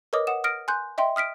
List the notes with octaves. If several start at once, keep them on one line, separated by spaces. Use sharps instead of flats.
A#4 B4 C#5 D#5 D6 D#6
F#5 D#6 E7
D#6 F6 A#6 D7
G#5 C6 F#6 G6
D#5 E5 G5 C6
D#6 F6 B6 D7